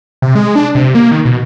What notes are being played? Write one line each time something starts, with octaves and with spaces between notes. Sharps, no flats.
C3
G#3
D4
C3
A#3
D#3
B2